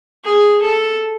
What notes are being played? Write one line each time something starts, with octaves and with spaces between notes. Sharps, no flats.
G#4
A4